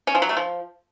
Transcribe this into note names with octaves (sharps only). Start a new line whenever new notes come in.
C#4
F3
F#3
A3
F3